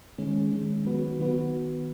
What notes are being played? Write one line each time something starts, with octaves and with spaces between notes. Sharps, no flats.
D#3 G#3 C#4
D#3 G#3 C#4
D#3 F#3 B3 F#4 B4
D#3 F#3 B3 F#4 B4